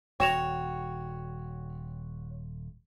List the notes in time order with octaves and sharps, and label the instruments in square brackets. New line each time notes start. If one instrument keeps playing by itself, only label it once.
[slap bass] D#1 [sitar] F#4 C#5 [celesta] G5 E7 F7